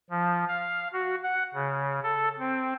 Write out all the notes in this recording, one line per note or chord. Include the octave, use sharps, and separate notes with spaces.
F3
F5
F#4
F#5
C#3
A4
C4